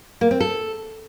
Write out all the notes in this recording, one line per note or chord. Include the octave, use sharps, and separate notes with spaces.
A#3
C4
A4